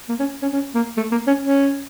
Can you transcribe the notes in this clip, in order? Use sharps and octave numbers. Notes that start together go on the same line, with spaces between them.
A#3
C#4
C#4
C#4
A#3
A3
A#3
C#4
C#4